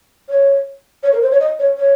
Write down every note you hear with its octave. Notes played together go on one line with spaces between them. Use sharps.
C#5
C#5
A#4
C5
C#5
D#5
C#5
C#5